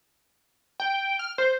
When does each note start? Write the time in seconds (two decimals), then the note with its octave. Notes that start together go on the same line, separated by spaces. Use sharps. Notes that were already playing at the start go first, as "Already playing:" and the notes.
0.80 G5
1.19 F6
1.38 C5